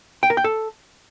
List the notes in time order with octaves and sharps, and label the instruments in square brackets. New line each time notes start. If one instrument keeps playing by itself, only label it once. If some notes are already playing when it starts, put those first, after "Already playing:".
[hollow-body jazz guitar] G5
A#4
G5
A4